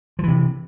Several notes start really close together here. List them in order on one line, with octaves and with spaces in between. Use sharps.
F3 E3 C3